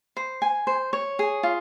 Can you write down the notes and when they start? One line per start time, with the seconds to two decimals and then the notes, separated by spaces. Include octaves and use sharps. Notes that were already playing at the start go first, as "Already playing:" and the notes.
0.17 C5
0.42 G#5
0.67 C5
0.93 C#5
1.19 G#4
1.43 F4